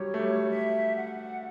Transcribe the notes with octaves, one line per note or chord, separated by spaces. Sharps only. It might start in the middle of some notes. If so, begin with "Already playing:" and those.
Already playing: F#3 G3 C#5
A3
G3
E5
F#5